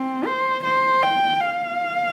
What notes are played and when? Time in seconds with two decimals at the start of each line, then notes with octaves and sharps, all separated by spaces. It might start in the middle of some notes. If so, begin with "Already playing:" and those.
Already playing: C4
0.26 C5
0.64 C5
1.03 G5
1.41 F5